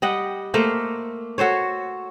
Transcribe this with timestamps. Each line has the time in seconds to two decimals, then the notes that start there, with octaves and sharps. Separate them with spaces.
0.02 G3 D#5 F#5 G5
0.54 A3 A#3 A#4 C5
1.38 F#4 A4 C5 C#5